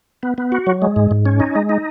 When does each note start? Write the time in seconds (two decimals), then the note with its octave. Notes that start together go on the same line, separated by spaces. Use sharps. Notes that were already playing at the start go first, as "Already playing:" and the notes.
0.23 B3
0.38 B3
0.52 F#4
0.67 F#3
0.82 G#3
0.96 G#2
1.11 G#2
1.26 C#4
1.40 D#4
1.55 G#3
1.69 D#4